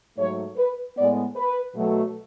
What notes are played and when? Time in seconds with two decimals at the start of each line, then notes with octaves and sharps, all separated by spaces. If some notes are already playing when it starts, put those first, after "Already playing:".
0.17 G#2 F#3 A3 C#5
0.57 B4
0.96 A2 G#3 B3 D5
1.35 B4
1.75 B2 F#3 A3